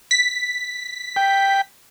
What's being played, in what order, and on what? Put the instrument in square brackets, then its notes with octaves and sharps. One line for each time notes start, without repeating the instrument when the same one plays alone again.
[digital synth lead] B6
[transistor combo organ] G5